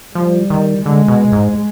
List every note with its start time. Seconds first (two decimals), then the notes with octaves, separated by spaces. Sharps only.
0.15 F3 G3
0.50 D#3
0.85 D3 G#3
1.08 B2
1.32 G#2